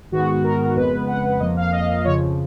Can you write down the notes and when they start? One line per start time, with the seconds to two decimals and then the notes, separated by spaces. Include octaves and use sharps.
0.11 G#2 D#3 G#3 B3 F#4
0.44 A#4
0.75 F2 C#3 G#3 B3 B4
1.08 F#5
1.40 F2 F3 A#3 D#5
1.57 F5
1.72 D#5
2.04 F2 C#3 F3 C#5